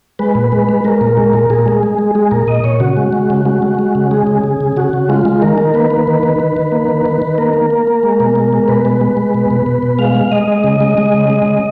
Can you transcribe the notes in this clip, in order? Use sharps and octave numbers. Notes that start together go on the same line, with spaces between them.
G#3 B4
A#2
G#3
G#3
G#3 A#4
A#2
G#3
A#2
A#2 G#4
A#4
G#3 G#4
G#3
G#3
G#3 G#4
A#2 A#4
A#2 D#5
A#2 C#5
C#3 F#4
G#3
G#3
C#3
G#3 F#4
G#3
G#3
C#3
G#3 G#4
C#3
C#3
C#3
C#3 F#4
C#3
G#3 F4
G#3
D#3 A#4
D#3
A#3 B4
A#3
D#3
D#3
D#3
D#3
A#3
D#3
D#3
D#3
A#3 A#4
A#3
A#3
A#3
G#3
B2
G#3
G#3
B2 B4
G#3
G#3
G#3
B2
B2
B2
B2
G#3 F5
G#3
G#3 D#5
G#3
C#3
G#3
G#3
C#3
G#3
C#3